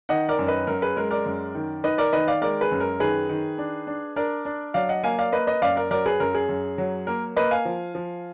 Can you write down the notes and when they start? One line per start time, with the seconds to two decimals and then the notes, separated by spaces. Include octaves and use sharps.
0.09 D#3 D#5 F#5
0.29 A#4 D5
0.39 F#2
0.48 B4 D#5
0.67 F#2 A#4
0.82 G#4 B4
0.96 G#3 A#4
1.11 A#4 D5
1.26 F#2
1.55 D#3
1.84 D#4 B4 D#5
1.98 A#4 D5
2.13 D#3 B4 D#5
2.28 D5 F5
2.42 G#3 A#4 D5
2.61 G#4 B4
2.71 F#2
2.80 A#4
3.00 D#3 G#4 B4
3.29 D#3
3.58 D4
3.87 D4
4.16 D4 A#4 D5
4.45 D4
4.74 F#3 D5 F5
4.89 D#5 F#5
5.04 A#3 F5 G#5
5.19 D5 F5
5.32 A#3 B4 D#5
5.47 B4 D#5
5.62 F#2 D5 F5
5.76 A#4 D5
5.91 F#3 A#4 D5
6.06 G#4 B4
6.20 F#2 A#4
6.35 G#4
6.49 F#2
6.78 F#3
7.07 A#3 A#4
7.36 A#3 B4 D#5
7.51 F5 G#5
7.65 F3
7.95 F3